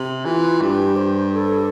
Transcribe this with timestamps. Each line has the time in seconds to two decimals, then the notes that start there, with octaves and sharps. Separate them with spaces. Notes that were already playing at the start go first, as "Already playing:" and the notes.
Already playing: C3
0.25 E3 F4
0.61 G2 G4
0.96 C5
1.33 A4